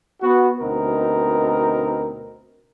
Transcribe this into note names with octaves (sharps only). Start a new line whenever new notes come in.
B3 F#4
D2 B2 C4 D#4 A#4